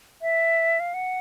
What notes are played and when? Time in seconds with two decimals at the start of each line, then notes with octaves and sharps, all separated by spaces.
0.22 E5
0.80 F5
0.94 F#5